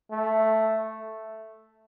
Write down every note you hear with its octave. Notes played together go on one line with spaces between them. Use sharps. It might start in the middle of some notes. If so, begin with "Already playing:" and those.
A3